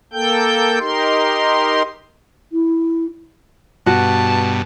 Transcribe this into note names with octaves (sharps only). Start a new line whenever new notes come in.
A#3 A4 G5 G6
D#4 G4 A#4 C6
E4
G2 B2 F#4 A5